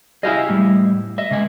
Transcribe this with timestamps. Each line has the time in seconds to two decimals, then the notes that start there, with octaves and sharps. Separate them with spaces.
0.23 E4 G4 G#4 D#5 F5 G#5
0.49 A2 G3
1.18 D#5 E5
1.31 C#3 G#3 G#5